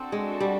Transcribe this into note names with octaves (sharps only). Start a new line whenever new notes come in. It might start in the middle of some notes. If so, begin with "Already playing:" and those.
Already playing: C4 D4 F#4 A4
G#3
G3